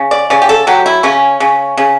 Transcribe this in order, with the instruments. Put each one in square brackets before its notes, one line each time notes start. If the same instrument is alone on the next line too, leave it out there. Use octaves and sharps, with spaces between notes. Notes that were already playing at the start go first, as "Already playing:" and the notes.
Already playing: [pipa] C#3
D5
C#3 D5
G4
A4
F#3 G4
E4
C#3 C#4
C#3
C#3